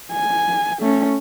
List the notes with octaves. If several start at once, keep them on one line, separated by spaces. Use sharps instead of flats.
G#5
A3 C#4